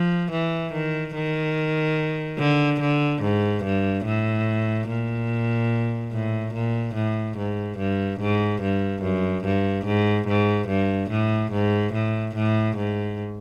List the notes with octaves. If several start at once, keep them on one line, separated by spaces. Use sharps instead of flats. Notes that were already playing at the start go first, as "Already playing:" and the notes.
Already playing: F3
E3
D#3
D#3
D3
D3
G#2
G2
A2
A#2
A2
A#2
A2
G#2
G2
G#2
G2
F#2
G2
G#2
G#2
G2
A2
G#2
A2
A2
G#2